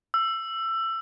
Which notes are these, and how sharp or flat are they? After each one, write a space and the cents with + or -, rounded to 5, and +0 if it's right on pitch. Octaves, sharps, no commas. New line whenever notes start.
E6 +20